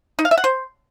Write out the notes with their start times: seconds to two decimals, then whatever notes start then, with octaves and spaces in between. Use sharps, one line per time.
0.19 D#4
0.25 F5
0.31 E5
0.38 F#5
0.44 C5